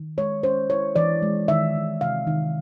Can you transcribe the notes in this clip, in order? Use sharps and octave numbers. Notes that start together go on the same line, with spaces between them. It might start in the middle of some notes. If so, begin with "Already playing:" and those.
Already playing: D#3
G#3 C#5
C#4 C5
E4 C#5
E3 D5
G#3
D#3 E5
D#3
C3 F5
D#3